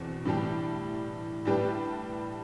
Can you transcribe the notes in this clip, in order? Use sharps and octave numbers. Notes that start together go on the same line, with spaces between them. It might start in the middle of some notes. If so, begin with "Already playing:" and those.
Already playing: E2 B2 C4
A2 E3 G3 D4 G4
A2 G3 D4 G4 B4